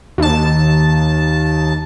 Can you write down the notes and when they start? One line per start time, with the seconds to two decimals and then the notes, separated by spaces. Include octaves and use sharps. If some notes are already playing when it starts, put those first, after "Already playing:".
0.18 D#2 A5